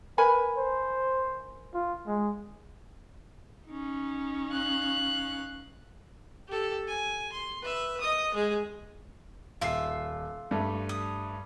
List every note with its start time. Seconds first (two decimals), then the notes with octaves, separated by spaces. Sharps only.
0.18 A#4 B4 G#5 B5
0.57 C5
1.74 F4
2.07 G#3
3.67 C#4 D#4
4.51 F5 F#6
6.48 G4 A4
6.88 G#5
7.33 C6
7.62 B4 E5
8.01 D#5 D#6
8.34 G#3 G#4
9.61 D#1 F4 E5 C7
10.51 G2 A3
10.89 D#6